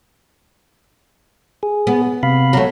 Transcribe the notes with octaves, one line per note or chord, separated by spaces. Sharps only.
G#4
B3
C3 F5 B5
F#3 A3